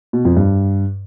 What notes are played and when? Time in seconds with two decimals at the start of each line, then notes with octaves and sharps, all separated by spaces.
0.13 B2
0.25 F2
0.37 G2